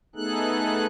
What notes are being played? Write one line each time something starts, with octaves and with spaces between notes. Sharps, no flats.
A3 B3 D#4 G#4 A4 F#6